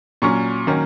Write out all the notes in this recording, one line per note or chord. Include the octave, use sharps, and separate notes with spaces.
A#2 F#3 C#4 C#6
D#3 F#3 A#3 C#4